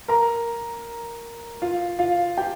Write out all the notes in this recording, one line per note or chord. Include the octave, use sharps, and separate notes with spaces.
A#4 A#5
F4 F5
F4 F5
G4 G5